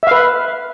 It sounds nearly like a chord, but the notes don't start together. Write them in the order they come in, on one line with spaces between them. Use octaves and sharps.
E5 F5 B4